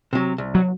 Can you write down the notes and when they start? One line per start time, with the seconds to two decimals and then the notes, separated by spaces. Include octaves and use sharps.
0.13 C3 F#3
0.38 C2
0.55 F#3